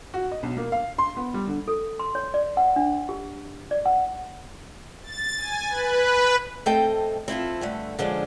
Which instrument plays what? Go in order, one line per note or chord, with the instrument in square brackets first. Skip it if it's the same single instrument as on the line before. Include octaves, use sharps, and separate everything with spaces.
[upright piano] F#4
D#5
B1
A#3
F5
C6
B3
G3
D3
[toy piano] A4
C6
C#5
D5
F#5
D4
G4
D5
F#5
[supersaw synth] A6
G#5
B4
[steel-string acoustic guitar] A3 C4 A4 D#5 G5
C4 E4 F4 A4
G2 D3 A3
D3 F3 G#3 C#4 D4